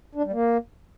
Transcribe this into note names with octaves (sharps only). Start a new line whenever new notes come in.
D4
G3
A#3